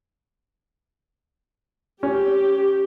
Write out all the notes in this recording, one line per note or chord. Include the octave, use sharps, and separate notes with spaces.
C#4 G4